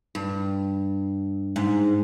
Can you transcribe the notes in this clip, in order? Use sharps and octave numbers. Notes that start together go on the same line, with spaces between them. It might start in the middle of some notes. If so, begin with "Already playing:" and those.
G2
G#2